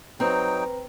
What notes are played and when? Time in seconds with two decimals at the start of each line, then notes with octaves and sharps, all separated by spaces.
0.20 F#3 C4 D#4 B4 G5 A#5